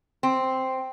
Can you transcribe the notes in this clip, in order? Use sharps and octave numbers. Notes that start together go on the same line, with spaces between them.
C4